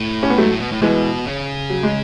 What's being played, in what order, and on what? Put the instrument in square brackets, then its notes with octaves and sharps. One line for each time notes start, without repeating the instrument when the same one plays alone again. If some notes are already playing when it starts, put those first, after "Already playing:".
Already playing: [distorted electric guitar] A2
[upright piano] C#4
B3
[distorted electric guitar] G#2 [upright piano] F#3 A3
[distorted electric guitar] A2
B2
A2
[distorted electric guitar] B2 [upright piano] E3 G#3
[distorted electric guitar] C#3
[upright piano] F#3
G#3